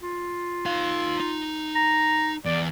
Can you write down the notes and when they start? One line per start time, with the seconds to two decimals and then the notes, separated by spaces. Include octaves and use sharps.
0.02 F4
0.66 D#4 F5
1.20 D#4
1.75 A#5
2.45 E2 D5